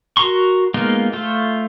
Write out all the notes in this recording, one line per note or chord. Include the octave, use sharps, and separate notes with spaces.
F#4 A#4 A#5 C6 C#6
G#3 A#3 B3 D#4 F4
A3 F4 C5